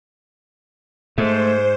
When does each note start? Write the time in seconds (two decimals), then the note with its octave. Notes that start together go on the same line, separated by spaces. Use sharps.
1.18 G#2 A3 C5